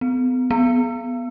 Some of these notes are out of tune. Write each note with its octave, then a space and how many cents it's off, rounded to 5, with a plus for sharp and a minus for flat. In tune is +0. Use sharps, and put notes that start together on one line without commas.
B3 +40
B3 -5